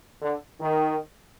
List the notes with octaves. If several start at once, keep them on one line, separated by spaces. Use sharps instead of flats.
D3
D#3